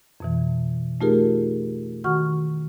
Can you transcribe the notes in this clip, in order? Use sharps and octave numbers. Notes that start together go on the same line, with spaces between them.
F2 B2 E3
A3 D#4 F4 G4 G#4 A#4
D#3 F#4 F#5 C#6 F6